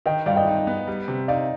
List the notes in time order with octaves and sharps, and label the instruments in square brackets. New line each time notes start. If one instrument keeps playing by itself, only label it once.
[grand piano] D#3 [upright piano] D#5 G5
[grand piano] G2 [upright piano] D5 F5
[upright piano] D#5 G5
[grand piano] D#4
B3
G3
C3
[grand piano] D#4 [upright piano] D5 F5